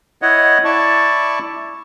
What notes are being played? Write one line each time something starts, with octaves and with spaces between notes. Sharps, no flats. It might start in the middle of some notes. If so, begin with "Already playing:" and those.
E4 C#5 D#5 F#5
E4 D5 A5 C#6